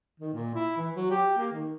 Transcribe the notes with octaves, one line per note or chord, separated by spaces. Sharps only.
D#3
A#2
E4
E3
F#3
G4
A#3
D#3